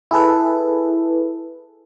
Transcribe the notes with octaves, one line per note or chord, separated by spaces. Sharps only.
E4 G#4 A4 B4